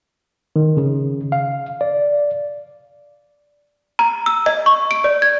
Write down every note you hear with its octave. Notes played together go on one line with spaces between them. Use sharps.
D#3
C#3
F5
D5
A#5
E6
D#5
C#6
D7
D5
G#6